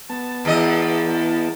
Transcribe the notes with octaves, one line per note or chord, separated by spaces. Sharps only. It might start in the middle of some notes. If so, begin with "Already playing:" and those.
B3 A5
E2 D#5